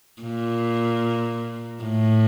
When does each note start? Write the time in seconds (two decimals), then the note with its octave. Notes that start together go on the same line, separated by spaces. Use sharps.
0.22 A#2
1.84 A2